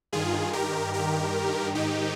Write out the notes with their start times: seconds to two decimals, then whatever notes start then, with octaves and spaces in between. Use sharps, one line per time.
0.12 G2 D#3 F4 G#4
0.53 G4 A#4
0.94 G4 A#4
1.75 G#2 D#3 D#4 G4